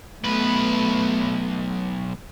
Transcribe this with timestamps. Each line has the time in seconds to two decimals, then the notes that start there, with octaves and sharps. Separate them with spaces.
0.24 B1 A3 B3 B4